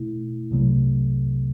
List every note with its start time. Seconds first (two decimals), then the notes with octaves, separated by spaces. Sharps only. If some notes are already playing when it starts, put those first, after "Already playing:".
Already playing: B2 A3 E4
0.51 C2 C3 F#3 A3